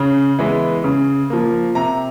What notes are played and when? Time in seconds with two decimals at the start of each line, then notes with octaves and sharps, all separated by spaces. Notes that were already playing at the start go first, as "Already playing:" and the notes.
Already playing: C#3
0.39 E3 G#3 B3
0.84 C#3
1.30 F3 A#3
1.75 C3 A#5